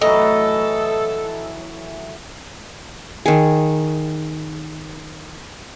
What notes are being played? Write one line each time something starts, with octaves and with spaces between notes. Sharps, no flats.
A2 E3 F#3 A4 D#5
D#3 G#4